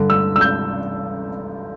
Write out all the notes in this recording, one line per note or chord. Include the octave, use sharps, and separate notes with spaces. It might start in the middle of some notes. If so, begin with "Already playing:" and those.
Already playing: G2 D3
E6
E6
G6